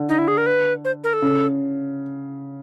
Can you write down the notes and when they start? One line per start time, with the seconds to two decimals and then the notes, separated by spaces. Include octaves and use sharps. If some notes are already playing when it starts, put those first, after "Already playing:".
Already playing: D3
0.09 D#4
0.18 E4
0.28 G#4
0.37 A#4
0.46 B4
0.85 C5
1.04 A#4
1.13 A4
1.22 C#3